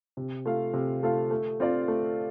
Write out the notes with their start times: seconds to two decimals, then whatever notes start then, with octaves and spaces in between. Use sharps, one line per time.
0.17 C3
0.45 A3 F4 A4 F5
0.74 C3
1.03 A3 F4 A4 F5
1.31 A3
1.60 C4 F4 D5 F5
1.88 A3